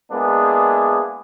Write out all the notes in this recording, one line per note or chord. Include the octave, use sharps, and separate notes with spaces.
G#3 A#3 B3 D4 E4 G#4